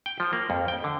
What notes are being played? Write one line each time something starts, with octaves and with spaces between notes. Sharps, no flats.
G5
F3
A#3
F2
G5
D3